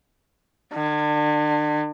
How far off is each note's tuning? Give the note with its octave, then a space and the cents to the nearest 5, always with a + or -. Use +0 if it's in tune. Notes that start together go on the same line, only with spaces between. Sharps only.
D3 +40